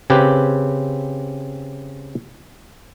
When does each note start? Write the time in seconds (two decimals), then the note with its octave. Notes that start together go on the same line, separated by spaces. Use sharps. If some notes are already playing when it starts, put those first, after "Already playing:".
0.10 C#3 C4 G4 B4